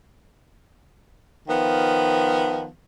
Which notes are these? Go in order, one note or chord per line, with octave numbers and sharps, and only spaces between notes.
D#3 F3 B3